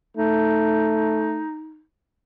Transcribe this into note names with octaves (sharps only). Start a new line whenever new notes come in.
A3 D#4